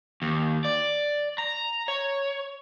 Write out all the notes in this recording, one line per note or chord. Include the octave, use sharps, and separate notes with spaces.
D#2
D5
A#5
C#5